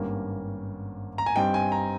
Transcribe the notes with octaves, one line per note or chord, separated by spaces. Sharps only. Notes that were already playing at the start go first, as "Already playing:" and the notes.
Already playing: G#1 G2 G3 A#3 C#4
A#5
G#5
G2 G3 C4 D#4 G5
G#5
A#5